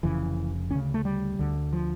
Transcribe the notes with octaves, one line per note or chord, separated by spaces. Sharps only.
F1 F2 C#3 E3
D2 C#3 C#4
A3
G3
D2 D3
F3